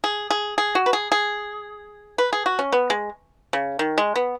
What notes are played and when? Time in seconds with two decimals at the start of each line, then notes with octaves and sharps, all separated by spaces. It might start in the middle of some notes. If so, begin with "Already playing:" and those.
0.04 G#4
0.30 G#4
0.58 G#4
0.75 F#4
0.86 B4
0.93 G#4
1.12 G#4
2.18 B4
2.33 G#4
2.46 F#4
2.59 C#4
2.72 B3
2.90 G#3
3.53 C#3
3.79 D#3
3.98 G#3
4.16 B3